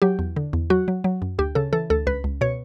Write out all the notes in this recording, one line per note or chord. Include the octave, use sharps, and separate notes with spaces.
F#3 G4
E2
D3
E2
F#3 F#4
F#3
F#3
F#2
D2 G4
C#3 A4
E3 A4
D2 A4
C#2 B4
C#2
B2 C#5